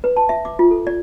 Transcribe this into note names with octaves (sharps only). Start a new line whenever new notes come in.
B4
A5
E5
D6
F4
A4
D5